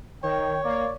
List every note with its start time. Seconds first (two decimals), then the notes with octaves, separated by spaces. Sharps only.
0.23 D#3 C#5 G5
0.64 A#3 D5